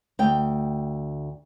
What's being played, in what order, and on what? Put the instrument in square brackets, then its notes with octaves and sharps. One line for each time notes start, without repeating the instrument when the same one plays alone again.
[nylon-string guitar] D2 G5